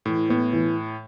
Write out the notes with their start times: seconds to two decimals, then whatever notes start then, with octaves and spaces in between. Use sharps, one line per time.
0.05 A2 E3
0.29 A2 B3
0.53 E3